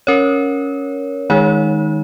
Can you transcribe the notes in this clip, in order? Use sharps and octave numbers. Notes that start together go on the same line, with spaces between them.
C#4 A#4 C#5
D#3 G#3 D#4 C#5